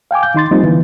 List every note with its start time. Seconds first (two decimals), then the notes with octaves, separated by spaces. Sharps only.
0.11 F5 G5 G#5 D6
0.23 G6
0.35 D#3 D#4 C6 A6
0.51 F3 G3 A#3 C4 D#4 F4
0.63 D3 E3 B3